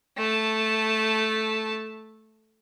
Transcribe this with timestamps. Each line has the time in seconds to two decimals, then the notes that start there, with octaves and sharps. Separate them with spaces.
0.17 A3 A5